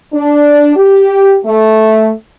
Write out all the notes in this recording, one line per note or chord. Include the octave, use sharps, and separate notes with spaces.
D4
G4
A3